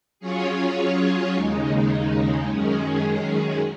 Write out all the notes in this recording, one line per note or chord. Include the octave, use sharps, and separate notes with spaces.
F#3 C#4 F4 G#4 C#5
D#2 C#3 G#3 D#4
F#2 D#3 G#3 C#4 G#4